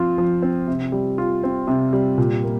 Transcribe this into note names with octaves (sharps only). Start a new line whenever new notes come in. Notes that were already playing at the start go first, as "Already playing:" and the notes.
Already playing: F3 C4 F4
F3
C4
C3
G3
F4
C4
C3
G3
A#2
A#3